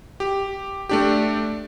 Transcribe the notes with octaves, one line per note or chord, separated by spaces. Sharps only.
G4
A3 D4 G4